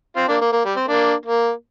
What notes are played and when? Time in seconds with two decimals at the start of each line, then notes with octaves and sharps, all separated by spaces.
0.16 C4 F4
0.28 A#3 D4
0.41 A#3
0.52 A#3
0.65 G3
0.76 C4
0.88 A#3 D4
1.25 A#3